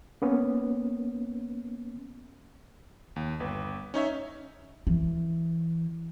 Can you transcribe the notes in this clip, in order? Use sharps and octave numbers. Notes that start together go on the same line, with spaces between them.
A#3 B3 C#4
D#2
G1 B4
C#4 D#4 C#5 E5
E3